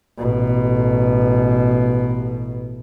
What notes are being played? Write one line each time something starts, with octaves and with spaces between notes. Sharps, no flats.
A1 B2